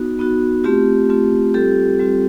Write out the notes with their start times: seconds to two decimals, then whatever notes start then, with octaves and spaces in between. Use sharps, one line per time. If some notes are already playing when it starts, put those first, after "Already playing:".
Already playing: B3 D#4 F#4
0.19 B3 D#4 F#4
0.64 A3 C4 F4 G4
1.09 A3 C4 F4
1.54 G3 C4 F4 G4 A4
2.00 G3 C4 F4